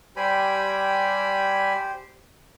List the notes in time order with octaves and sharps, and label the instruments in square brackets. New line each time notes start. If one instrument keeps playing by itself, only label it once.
[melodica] G3 G#5 B5 [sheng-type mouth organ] G4 C5